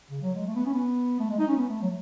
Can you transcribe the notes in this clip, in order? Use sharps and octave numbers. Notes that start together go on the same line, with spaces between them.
C#3
F#3
G#3
A3
B3
C#4
B3
A3
G#3
D#4
C#4
B3
A3
F#3